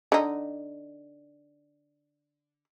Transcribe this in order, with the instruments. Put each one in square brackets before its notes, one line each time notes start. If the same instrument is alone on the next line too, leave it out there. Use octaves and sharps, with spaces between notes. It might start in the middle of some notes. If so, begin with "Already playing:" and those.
[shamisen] D3 D#4